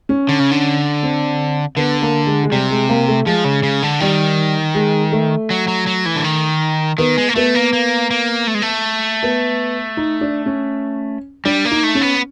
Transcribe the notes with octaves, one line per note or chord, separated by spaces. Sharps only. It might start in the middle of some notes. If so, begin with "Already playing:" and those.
C#4
D3
C#3
D3
C4
D3 B3
A#3
G#3
G#3
C3 G3
G#3
A#3
A3
F3 G#3
C#3
C#3
D3
D#3 G3
G#3
A3
F#3
F#3
F#3
E3
D3
D#3
D#3 B3
G#3
A#3
A3 B3
A#3
A#3
A#3
A3
G#3
A3
B3
D#4
D4
C#4
G3 D4
A#3
D#4
A3
C#4
B3